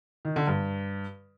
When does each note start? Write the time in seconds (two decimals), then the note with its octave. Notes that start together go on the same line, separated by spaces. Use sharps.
0.25 D#3
0.36 D3
0.47 G2